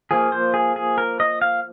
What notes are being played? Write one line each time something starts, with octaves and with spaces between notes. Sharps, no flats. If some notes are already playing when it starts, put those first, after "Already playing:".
F3 A#3 G#4
C5
G#4
G#4
A#4
D#5
F5